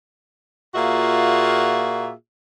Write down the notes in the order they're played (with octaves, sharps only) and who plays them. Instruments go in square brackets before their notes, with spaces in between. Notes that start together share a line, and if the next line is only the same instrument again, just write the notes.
[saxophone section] A#2 A#3 F4 F#4 G#4 E5